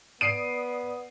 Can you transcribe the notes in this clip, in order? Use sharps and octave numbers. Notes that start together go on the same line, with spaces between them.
B3 D5 D#6 C7 D7 D#7